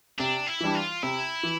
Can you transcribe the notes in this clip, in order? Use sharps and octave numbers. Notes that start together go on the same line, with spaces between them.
C3 D4
E4
E3 G3 D4
F4
C3 E4
E3